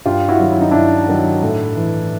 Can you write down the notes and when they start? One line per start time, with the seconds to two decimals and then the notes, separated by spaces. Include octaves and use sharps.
0.06 G2 F4 G4
0.28 E4 F#4
0.39 D#3 F#3
0.52 E4
0.61 D#4
0.71 G2 D4 E4
1.08 D#3 F#3
1.42 A2
1.77 E3